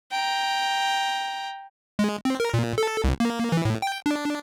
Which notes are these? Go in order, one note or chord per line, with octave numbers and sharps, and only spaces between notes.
G5 A#5
G#3
C4
A#4
A#2
A4
C2
A#3
E3
A2
G5
D4